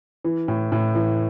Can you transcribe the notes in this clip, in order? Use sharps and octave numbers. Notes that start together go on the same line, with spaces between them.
E3
A2
A2
E3